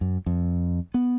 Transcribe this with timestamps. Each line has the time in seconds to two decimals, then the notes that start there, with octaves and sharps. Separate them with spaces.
0.01 F#2
0.26 F2
0.94 B3